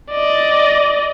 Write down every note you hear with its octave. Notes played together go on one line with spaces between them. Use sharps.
D5 D#5